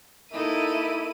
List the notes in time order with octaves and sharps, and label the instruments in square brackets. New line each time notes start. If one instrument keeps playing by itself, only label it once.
[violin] A#3 D#7 [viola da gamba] D#4 A4 [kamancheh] E4